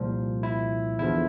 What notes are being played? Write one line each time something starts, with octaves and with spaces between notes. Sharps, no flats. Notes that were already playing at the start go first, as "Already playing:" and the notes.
Already playing: C2 A#2 F3
E4
E2 D3 F3 E4